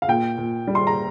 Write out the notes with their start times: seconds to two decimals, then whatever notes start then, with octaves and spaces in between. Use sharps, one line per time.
0.02 F5
0.08 A#2 G5
0.38 A#2
0.67 G3
0.75 C6
0.87 A#5